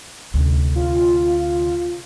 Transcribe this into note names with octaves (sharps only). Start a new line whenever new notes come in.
D2 C3
F4